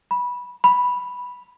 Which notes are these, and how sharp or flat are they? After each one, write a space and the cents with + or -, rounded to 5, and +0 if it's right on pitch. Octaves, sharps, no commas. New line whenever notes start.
B5 -15
B5 -5